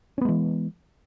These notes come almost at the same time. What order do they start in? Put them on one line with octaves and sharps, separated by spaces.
C#4 B3 G#3 E3